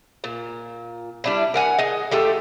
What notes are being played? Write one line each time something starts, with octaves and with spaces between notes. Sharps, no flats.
A#2
G3 D4 E4
A#4 F#5 G#5
G#4 D#5
A3 F4 G4 A4